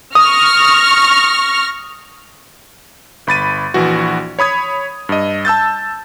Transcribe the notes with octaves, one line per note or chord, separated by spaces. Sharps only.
C#6 D#6 F6 A#6
G1 B5 A6 D#7
A#1 E3 F#4
C#5 B5 D#6 G#6
G2 D#5
A5 E6 G6 A6